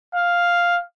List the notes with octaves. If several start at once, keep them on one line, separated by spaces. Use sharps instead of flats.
F5